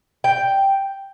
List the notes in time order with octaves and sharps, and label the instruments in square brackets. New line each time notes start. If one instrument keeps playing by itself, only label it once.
[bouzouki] G5